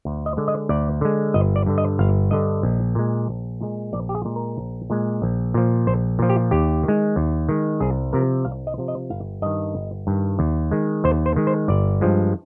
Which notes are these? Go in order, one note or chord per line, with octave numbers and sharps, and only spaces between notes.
D2
D#5
D3 G#3
D#5
D2 D5
D3 G#3
G1 D#5
D5
G2 D3
D#5
G1 F5
G2 D3 D#5
A#1
A#2 G#3
A#1
A#2 G#3
A#1 D5
G4
G#4
A#2 G#3
A#4
A#1
A#2 G#3
A#1
A#2 F3
A#1 C5
A#2 F3
G4
D#2 G4
D#3
G#3
D#2
D#3 G#3
C2 G#4
C3 F3 A#4
C2 F5
D#5
C3 F3
D#5
G1 F5
G2 D#3 D#5
G1
G2 D#3
D#2
D#3 G#3
D#2 C5
C5
D#3 G#3
C5
G1 D5
G2 F3 G#3